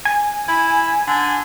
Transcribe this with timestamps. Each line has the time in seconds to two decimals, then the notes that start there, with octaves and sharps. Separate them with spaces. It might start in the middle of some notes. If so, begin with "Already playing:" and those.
0.05 G#5
0.48 E4
1.07 D3